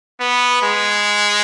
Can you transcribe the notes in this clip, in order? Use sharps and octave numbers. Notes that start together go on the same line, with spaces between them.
B3
G#3